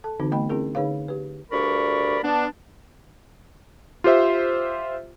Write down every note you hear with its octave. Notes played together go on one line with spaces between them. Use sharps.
A4 A5
D3 E3 C4 D#4 F#4
A3 B3 D#5 G5 B5
C4 C#4 E4 G#4 A#4
D3 D#4 G#4 B4 C#5 F5
G4 B4
D2 G2 A#4 D5 B5 C#6
B3 D4
F4 G4 C5 E5